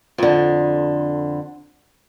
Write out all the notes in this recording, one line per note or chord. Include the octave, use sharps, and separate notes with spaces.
F2 D3